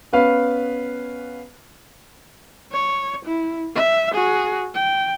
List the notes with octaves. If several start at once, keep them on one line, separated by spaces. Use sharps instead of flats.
B3 C#4 B4 F5
C#5
E4
E5
F#4 G#4
G5